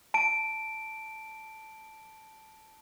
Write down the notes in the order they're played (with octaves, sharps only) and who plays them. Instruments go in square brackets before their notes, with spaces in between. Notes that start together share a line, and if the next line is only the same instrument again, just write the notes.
[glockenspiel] A5 D7